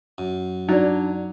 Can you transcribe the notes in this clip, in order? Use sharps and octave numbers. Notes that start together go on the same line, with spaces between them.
F#2
F#3 D4 D#4 D5